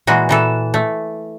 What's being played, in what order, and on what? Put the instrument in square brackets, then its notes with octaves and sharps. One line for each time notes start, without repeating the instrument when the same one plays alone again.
[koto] A#2 E3 G#3 F#4
A#2 E3 A4
A3